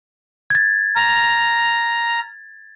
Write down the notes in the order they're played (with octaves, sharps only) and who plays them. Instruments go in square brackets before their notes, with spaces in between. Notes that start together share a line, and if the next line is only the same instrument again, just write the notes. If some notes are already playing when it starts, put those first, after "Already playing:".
[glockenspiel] G#6 A6
[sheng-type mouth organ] A#5 F6